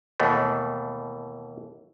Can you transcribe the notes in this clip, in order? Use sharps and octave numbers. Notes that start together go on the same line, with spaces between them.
D#2 B2 E3 A3